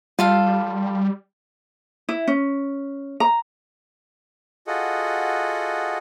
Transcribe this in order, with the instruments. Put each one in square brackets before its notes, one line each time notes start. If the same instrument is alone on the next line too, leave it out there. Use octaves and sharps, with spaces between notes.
[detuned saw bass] G3 [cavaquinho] F4 A4 F5
[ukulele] E4
C#4
A#5
[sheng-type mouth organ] F4 F#4 G#4 A4 D#5 F#5